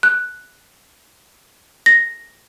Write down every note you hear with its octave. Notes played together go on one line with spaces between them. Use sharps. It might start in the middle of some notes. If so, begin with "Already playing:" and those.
F#6
A#6